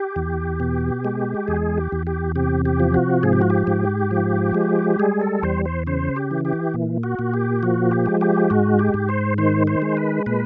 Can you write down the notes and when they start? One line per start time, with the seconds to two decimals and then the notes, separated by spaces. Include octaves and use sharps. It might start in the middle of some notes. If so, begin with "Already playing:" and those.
Already playing: G4
0.16 E2
0.60 B2
1.05 G#3
1.47 E2 G#4
1.78 G4
1.92 E2
2.07 G4
2.35 C3 G4
2.65 G4
2.80 F3
2.94 F#4
3.23 G#2 G#4
3.33 G4
3.41 F#4
3.50 G4
3.67 G#2
4.11 F3
4.55 G#3
4.99 G3 G#4
5.21 A4
5.43 E2 C5
5.65 C5
5.87 C#3 C5
6.16 G4
6.31 E3
6.45 G4
6.74 A#2
7.03 F#4
7.19 A#2
7.34 G4
7.63 F3 F#4
7.91 G4
8.06 G#3
8.21 G4
8.50 G#2 F#4
8.79 G4
8.94 G#2
9.09 C5
9.38 D#3 C5
9.67 C5
9.82 G#3
9.97 B4
10.26 A#2 B4